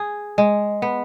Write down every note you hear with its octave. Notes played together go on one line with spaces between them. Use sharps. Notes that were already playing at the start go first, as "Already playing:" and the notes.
Already playing: G#4
G#3
B3